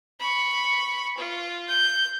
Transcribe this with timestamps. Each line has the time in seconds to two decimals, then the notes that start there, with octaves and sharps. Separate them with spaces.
0.20 B5 C#6
1.18 F4
1.68 G6